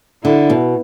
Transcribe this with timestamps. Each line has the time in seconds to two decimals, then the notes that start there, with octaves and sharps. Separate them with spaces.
0.24 D3 E4
0.50 B2